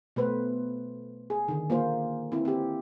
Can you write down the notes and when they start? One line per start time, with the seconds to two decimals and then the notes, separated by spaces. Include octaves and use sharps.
0.16 B2 A3 B4 C5
1.30 G#4
1.48 D3 D#3
1.70 A#3 F4 C5
2.32 C4 E4
2.45 C4 G4